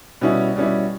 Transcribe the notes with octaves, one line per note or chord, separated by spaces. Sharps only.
B2 G3 C#4 E4
B2 G3 C#4 E4